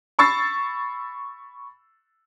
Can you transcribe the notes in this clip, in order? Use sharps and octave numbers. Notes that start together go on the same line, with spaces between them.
B5 C#6 E6 A6 C7